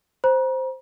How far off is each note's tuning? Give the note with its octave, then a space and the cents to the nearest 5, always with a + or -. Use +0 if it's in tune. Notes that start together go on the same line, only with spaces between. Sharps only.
C5 +0 A#5 +40